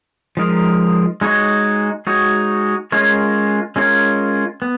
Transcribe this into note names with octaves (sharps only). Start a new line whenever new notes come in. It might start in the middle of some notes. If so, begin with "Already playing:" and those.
F3 G#3 D#4 A#4
G#3 D#4 F#4 C#5
G#3 D#4 F#4 C#5
G#3 C#4 F4 A#4 C#5
G#3 C#4 F4 A#4 C#5
B3